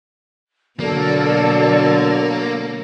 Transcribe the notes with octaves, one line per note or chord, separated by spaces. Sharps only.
B2 D3 F#3 A#3 A4 D5